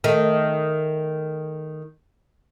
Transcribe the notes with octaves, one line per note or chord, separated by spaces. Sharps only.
D#3 A3